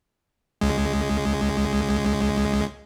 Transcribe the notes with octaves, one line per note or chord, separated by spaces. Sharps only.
C#2 G#3